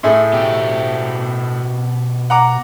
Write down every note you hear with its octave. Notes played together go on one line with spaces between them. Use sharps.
A2 A3 G#4
B2 G4
F#5 A#5 D6